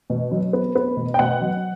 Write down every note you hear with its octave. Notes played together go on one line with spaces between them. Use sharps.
B2
F#3
B3
B3
B2
G5
B2 F#5
F#3